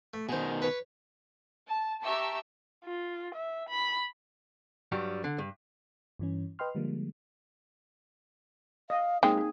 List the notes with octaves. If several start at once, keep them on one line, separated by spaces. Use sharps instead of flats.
A3
B2 D#3 G#4 C5
B4 C#5
A5
G4 E5 A5 A#5 C#6 E6
F4
E5
B5
G2 F#3 G3
D3
G2
G2 E3 C#4
B4 D#5 G5 C6 F6
D3 F3 G3 G#3 A#3
D#5 F5
G#3 A#3 C4 D#4 G#4 G5
G#4